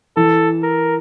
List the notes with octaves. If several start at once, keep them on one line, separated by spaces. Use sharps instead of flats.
E3 A4
A#4